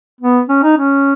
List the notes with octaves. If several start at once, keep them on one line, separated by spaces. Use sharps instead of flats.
B3
C#4
D#4
C#4